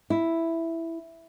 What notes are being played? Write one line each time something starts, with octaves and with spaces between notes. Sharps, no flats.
E4